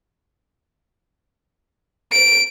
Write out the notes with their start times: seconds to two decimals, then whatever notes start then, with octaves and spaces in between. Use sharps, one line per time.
2.12 D7